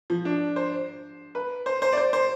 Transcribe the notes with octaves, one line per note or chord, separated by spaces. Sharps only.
F3
D4
C5
B4
C5
C5
D5
C5
C5